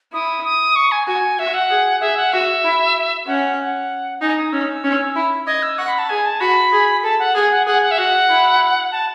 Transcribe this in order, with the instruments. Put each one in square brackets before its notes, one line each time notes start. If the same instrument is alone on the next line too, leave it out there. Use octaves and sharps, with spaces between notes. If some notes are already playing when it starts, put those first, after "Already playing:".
[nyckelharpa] E4 [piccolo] D#6
[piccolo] D#6
C#6
G#5
[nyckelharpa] F#4 [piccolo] G#5
[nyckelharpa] F#4 [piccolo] E5
[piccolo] F#5
[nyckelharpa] G#4
[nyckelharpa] G#4 [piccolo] E5
[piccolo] F#5
[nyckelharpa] F#4 [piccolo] E5
[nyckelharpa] E4
[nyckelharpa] C#4 [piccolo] F#5
[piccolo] F#5
[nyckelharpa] D#4 [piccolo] G#5
[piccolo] D#6
[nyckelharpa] C#4 [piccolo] E6
[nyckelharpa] C#4
E4
[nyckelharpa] D#5 [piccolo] G#6
[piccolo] E6
[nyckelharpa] F#5 [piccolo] C#6
[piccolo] B5
A5
[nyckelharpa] G#4 [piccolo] G#5
[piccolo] A5
[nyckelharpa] F#4 [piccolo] B5
[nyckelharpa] G#4
[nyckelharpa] A4 [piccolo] A5
[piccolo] F#5
[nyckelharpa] G#4
[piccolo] F#5
[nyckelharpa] G#4 [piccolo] F#5
[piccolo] F#5
E5
[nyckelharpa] F#4 [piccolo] F#5
[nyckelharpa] E4
[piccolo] A5